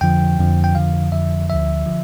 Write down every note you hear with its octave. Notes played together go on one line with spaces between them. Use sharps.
F2 D3 F3 G5
F2 D3 F3
G5
F2 D3 F3 F5
F2 D3 F3 E5
D2 D3 F3 E5
D3 F3